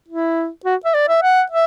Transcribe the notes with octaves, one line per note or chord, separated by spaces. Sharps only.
E4
F#4
E5
D5
E5
F#5
E5